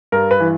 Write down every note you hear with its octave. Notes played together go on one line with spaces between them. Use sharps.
G2 A#4
B4
E3